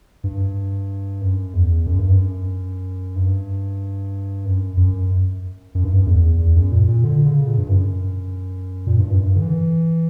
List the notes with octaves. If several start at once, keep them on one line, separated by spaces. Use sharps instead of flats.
G2
F#2
E2
F#2
G2
F#2
G2
F#2
F#2
F#2
G2
F#2
E2
E2
F#2
A#2
A#2
D3
C#3
A#2
G2
F#2
A#2
G2
F#2
G2
D3
E3